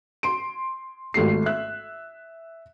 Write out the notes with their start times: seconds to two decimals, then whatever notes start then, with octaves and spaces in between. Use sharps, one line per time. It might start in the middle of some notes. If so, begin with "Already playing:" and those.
0.23 C6 D7
1.14 G#1 A3 G4 C7
1.46 E5 F#6